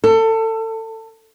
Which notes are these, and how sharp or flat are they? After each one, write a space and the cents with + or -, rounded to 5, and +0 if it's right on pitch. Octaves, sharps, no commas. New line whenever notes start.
A4 +25